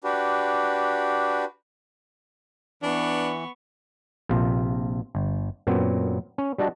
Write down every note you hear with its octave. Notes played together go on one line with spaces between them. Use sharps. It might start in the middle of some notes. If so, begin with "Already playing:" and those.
D4 F#4 G4 B4
E3 B3 D4 C#6
A#1 C3 F4
G1
F#2 A#2 F#3 B3 C4
C#4
G3 D4 F#4 D#5 A5